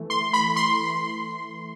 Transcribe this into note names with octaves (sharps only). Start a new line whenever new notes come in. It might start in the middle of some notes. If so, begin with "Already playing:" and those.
Already playing: E3 A3
C6
B5
C6